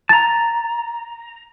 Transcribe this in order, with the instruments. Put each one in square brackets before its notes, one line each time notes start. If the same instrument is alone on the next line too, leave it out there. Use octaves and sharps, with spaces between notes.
[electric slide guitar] A5 A#5 [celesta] A6